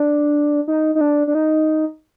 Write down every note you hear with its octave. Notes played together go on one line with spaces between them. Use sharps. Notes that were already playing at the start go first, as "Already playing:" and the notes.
Already playing: D4
D#4
D#4
D4
D4
D#4